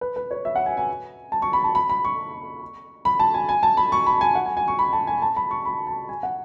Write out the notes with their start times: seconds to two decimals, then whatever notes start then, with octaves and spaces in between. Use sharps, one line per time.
0.01 B4
0.16 B4
0.31 C#5
0.45 E5
0.56 F#5
0.66 G#5
0.77 G#5
1.32 A5
1.42 C#6
1.53 B5
1.64 A5
1.75 B5
1.90 B5
2.05 C#6
3.05 B5
3.20 A5
3.34 G#5
3.49 G#5
3.63 A5
3.77 B5
3.92 C#6
4.07 B5
4.21 G#5
4.35 F#5
4.46 G#5
4.57 G#5
4.68 C#6
4.79 B5
4.93 A5
5.07 G#5
5.22 A5
5.36 B5
5.51 C#6
5.65 B5
5.87 A5
6.09 G#5
6.23 F#5